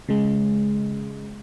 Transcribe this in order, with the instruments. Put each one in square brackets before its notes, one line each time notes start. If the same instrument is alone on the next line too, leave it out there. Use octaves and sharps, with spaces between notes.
[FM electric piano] C#3 G#3